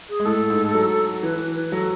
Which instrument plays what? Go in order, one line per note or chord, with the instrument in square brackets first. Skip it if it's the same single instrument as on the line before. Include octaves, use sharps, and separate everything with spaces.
[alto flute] G#4
[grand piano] G#3
[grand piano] A2 A3 [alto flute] A4
[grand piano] G#2 G#3
F#3
[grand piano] E3 [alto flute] B4
[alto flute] B4
B4
[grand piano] F#3 [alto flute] A4